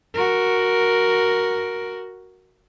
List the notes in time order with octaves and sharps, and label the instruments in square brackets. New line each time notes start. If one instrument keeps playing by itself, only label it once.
[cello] F#4 A#4